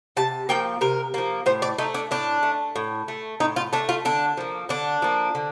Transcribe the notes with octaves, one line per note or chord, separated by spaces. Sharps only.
C3 A5
F3 A#3 G5
C3 A#4
F3 A#3
A2 C5
D5
A3 D#4
D4
A2 D4
A3
A2
A3
A2 D#4
F4
A3 D4
F4
D3 D4
F3 A#3
D3 D4
F3 A#3
D3